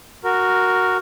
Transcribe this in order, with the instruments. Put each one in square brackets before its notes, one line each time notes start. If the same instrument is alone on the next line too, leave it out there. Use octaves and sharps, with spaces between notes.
[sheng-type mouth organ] F#4 A#4